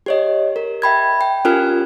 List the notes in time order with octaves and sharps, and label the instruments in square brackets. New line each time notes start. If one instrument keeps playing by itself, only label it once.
[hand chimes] G4 C#5 D#5
A#4
E5 G5 B5 G#6
G5
C#4 F4 G4 A#4 G#5 F6